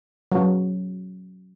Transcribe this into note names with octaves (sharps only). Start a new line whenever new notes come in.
F#3